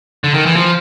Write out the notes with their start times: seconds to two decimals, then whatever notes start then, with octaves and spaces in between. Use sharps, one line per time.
0.24 D3
0.34 D#3
0.46 E3
0.56 F3